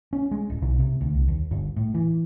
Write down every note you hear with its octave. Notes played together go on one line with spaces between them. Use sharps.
C#4
G#3
D1
B1
C3
D2
C2
D#2
G1
A2
E3